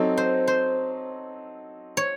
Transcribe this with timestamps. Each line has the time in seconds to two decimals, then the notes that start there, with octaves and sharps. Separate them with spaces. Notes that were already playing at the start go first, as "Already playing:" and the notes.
Already playing: F#3 C4 D#4 A4
0.17 C5
0.48 C5
1.97 C#5